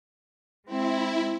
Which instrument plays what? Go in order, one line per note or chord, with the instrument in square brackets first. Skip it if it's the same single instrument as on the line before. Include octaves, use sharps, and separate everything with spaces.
[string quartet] G#3 C4 [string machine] E4